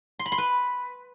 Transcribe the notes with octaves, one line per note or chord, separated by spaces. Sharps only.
C6
B5
C6
B4